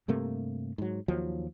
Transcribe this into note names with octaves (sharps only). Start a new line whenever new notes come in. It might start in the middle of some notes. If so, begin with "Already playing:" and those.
G2 C3 A3 A#3
G#2 F#3
D#2 F3 F#3